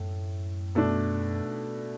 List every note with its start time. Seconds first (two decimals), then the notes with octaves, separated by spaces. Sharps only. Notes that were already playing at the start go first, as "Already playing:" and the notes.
Already playing: F#2 A2 A3
0.75 B2 A3 D4